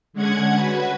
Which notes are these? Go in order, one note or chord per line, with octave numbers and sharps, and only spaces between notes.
D3 G#3 C#4 F#5 G#6
F#4 B4